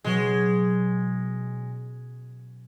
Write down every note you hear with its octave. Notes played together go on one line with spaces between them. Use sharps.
B2 F#3 G#3 C#4